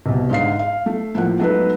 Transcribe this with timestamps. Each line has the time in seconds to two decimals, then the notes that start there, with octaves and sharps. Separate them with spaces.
0.06 C2 B2
0.30 G#2 D3 F5 C7
0.59 F5
0.86 A3
1.15 A2 F3 A#3 F#5
1.40 F#3 G#3 A3 B3 D#4 B4